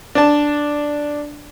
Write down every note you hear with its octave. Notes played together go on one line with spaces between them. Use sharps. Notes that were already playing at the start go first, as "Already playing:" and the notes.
D4 A5